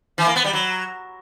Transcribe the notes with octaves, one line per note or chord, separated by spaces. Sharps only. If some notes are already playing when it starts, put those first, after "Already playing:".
E3
A#3
B3
G3
F#3